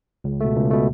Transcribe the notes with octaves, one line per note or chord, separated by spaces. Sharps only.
C#2
B2 A3
C#2
B2 A3